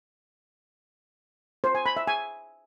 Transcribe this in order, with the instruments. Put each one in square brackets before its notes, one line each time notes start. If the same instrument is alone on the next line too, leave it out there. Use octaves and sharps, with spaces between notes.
[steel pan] C5
G#5
B5
E5
G#5